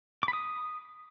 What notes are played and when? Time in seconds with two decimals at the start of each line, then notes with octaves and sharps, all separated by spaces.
0.23 D6
0.28 B5
0.33 D#6